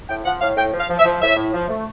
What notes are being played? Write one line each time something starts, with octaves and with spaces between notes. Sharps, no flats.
A2 G5
F3 F#5
A2 F5
A2 G5
F3
F5
F3
E5
F3
A2 E5
A2
F3
A3